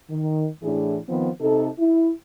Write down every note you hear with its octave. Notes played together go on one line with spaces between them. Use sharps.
D#3
A2 E3 D4 G#4
D#3 F3 B3 C4
C3 D#4 A4
E4